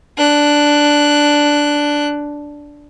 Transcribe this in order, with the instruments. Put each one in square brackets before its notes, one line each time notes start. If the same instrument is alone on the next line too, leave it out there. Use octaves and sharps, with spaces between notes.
[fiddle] D4 F#6